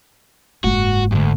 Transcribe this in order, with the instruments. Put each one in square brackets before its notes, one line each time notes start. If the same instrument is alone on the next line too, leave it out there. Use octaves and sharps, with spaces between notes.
[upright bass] F#1 G#2 [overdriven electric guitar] F#4
[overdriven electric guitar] D2 G2